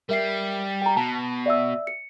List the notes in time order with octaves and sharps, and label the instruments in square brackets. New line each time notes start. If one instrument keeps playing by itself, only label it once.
[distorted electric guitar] G3 [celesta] A#4 E5 C7
[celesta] G5 A#5
[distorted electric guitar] B2 [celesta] A5
[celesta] D5 E5 E6
C#7